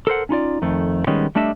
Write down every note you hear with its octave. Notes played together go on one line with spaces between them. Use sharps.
A4 A#4 C5 F#5
C#4 D#4 F4 D5
F2 D#3 A3
D#3 G3 G#3 B3 C#4 D#4
G3 A3 D4 D#5 E5